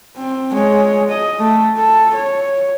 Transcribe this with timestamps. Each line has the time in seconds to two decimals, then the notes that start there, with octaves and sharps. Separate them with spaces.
0.17 C4
0.53 G#3 C#5
1.09 D#5
1.39 A3
1.78 A4
2.14 C#5